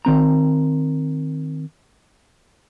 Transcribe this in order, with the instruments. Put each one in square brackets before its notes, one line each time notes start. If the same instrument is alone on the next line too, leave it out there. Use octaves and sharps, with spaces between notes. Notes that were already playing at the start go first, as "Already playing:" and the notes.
[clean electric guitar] D#3 C4 A#5